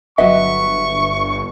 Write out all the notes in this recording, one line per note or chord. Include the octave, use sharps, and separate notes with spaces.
G1 F#3 B3 D#5 E5 C#6